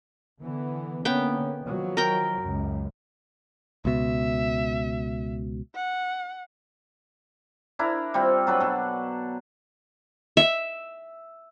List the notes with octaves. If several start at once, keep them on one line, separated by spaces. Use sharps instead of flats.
D3 E3 B3
D3 A#3 B3 C#4 G5
D#3 F3 F#3
A#4 G5
C#2 F#2
C#2 B2 E5
F#5
D4 E4 A#4
G3 C4 F4
F#3 D4 B4
B2 A4
E5